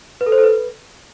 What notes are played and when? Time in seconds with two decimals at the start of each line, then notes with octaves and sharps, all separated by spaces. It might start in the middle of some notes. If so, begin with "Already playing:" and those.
0.21 B4
0.26 A4
0.32 C5
0.38 A4
0.44 B4